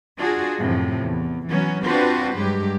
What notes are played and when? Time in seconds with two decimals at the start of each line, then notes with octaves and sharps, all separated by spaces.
0.18 D4 F4 F#4 G#4
0.58 F#2 A2 C3 F3
1.02 E2
1.48 E3 F#3 B3 C#4
1.83 C4 D4 F4 F#4 B4 C5
2.35 G2 F#3 G#3 G4